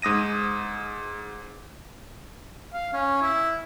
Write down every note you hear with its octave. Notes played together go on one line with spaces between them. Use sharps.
G#2 D#6 A#6 D#7
F5
C#4
E4